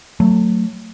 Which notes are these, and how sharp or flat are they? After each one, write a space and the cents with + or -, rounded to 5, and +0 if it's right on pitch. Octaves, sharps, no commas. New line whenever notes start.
F#3 +0 A3 +20